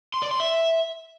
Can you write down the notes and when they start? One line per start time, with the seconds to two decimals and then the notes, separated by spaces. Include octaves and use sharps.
0.14 C6
0.22 D5
0.31 C6
0.40 E5